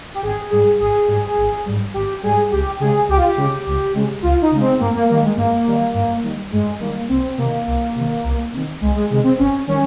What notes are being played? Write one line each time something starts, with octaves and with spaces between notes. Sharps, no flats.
G4
G#1 G#4
G#2 G3 G#4
G#1 G#4
G#2 G3
G#1
G#2 G3
G#1 G4
G#2 G3 G#4
C#2 G4
C#3 G#3 G#4
C#2 G4
F4
G4
C#3 G#3
C#2
C#3 G#3
C#2 F4
D#4
C#3 G#3
C4
G2 A#3
A#3
D#3 G3 A#3
G#3
G2 A#3
D#3 G3
G2
D#3 G3
G2 G#3
D#3 G3 A#3
C2 C4
C3 D#3 A#3
C2
C3 D#3
C2
C3 D#3
C2 G#3
G#3
C3 D#3 G#3
C4
G1 C#4
D#3 G3 C#4